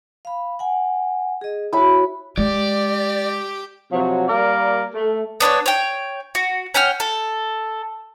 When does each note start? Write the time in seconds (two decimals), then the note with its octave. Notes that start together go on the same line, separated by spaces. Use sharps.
0.25 F5 B5
0.59 F#5 G#5
1.41 G#4 D#5
1.73 E4 F#4 C#5 B5
2.38 G#3 G4 D5 D6
3.91 C3 F3 F#3
4.29 G3 A#3 A#4 D5
4.94 A3
5.40 B3 D4 B4 C#5
5.66 C#5 G5
6.35 F#4
6.74 C#4 F#5 G5 F6
7.00 A4